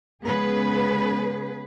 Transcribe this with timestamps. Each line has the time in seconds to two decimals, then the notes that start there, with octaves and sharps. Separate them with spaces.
0.23 C#3 G#3 B3 G#4 B4